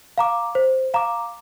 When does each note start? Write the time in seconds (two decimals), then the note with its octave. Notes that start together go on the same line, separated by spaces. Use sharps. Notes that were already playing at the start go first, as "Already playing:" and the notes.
0.18 F5 A#5 D6
0.55 C5
0.94 F5 A#5 D6